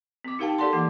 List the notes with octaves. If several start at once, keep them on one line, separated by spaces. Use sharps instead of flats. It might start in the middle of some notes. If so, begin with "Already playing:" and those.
C4 D6
D#4 G4 A#4 F5 G5 A5
G4 A4 D5 F#5 A5 C6
E3 A#3 F#5